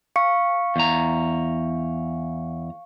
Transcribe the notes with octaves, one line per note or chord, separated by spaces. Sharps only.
F5 C#6 C#7
E2 A#5